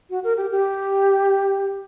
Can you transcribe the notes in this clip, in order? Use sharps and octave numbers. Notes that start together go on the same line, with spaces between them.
F#4
A#4
G4
G4